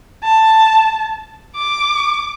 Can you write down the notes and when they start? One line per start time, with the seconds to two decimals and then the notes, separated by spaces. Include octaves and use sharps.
0.23 A5
1.55 D6